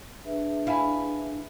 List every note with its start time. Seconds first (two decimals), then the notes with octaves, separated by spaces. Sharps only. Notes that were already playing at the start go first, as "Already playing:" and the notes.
0.25 D4 G#4 B4 E5
0.67 E4 F5 G#5 B5